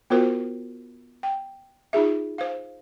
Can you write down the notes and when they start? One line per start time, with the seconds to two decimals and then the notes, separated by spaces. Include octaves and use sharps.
0.10 B3 F4 F#4 A#4 C5
1.23 G5
1.93 D#4 F4 G#4 E5
2.38 C5 F5